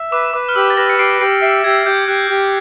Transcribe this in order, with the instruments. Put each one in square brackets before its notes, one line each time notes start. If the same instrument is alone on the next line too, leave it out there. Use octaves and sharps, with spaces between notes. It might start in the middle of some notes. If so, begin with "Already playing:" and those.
Already playing: [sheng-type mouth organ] E5
[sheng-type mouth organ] B4 [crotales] D6
[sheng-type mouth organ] B4 [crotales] D6
[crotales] F6
[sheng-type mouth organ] G4 [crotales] E6
[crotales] A6
[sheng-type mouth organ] B4 [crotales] A#6
[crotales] C#7
[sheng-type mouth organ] G4 [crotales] C7 D7
[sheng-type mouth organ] G4 [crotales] C7 D7
[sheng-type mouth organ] E5 [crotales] C7 D7
[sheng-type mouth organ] G4 [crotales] G#6
[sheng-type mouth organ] G4 [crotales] G6
[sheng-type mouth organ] G4 [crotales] F#6
[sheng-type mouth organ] G4